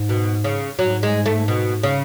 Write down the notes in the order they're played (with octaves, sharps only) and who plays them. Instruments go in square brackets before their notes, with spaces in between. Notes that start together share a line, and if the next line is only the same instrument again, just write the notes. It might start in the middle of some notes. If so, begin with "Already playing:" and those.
Already playing: [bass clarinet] G#2
[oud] B2
C#3
[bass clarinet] G#2 [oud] F#3
[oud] G#3
A3
B2
C#3